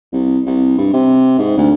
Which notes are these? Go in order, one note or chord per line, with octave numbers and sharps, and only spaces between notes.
C2
C2
G2
C3
G#2
D2